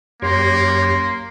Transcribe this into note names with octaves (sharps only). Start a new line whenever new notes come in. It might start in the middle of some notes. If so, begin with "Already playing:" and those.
F#2 A#3 G4 C#5 C6